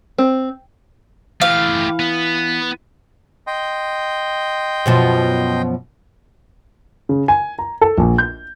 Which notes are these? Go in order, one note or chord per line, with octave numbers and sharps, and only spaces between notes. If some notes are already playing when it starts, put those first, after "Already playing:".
C4
E3 A3 G4 F5
B3
D#5 G5 C6
F#2 B2 F3
C#3
G#5
A#5
A4
A#1
G6